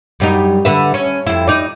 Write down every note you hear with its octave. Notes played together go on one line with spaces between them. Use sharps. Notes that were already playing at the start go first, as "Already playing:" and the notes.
F#2 G3 D#4
D3 B4 E5
C#4
F2 E4
D#4 D5